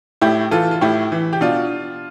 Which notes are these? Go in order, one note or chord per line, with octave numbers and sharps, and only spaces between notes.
A2 E4 G4
E3 F4 A4
F4
A2 E4 G4
E3
G4
B2 D4 F4